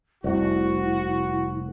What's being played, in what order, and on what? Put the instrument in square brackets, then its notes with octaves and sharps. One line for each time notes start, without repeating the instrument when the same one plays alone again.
[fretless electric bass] F1 [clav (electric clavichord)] C2 [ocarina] E4 [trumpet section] F#4